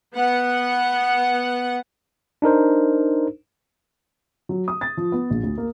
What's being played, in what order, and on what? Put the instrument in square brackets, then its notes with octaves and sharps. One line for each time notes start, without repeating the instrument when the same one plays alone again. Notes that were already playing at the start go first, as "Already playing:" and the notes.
[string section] B3 F#5
[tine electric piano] D4 D#4 A#4 C5
[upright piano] F#3
D#6
A6
F3
B3
A#1
D2
A#3